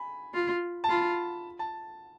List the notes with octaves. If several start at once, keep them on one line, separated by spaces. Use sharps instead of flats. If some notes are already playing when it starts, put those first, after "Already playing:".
Already playing: G#5 B5
F4
A5
F4 B5
A5